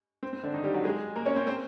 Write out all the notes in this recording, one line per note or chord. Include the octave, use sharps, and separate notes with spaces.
C4
C4
D3 D4
D#3 D#4
G3 G4
F#3 F#4
G#3 G#4
A#3 A#4
C#4 C#5
C4 C5
C4 C5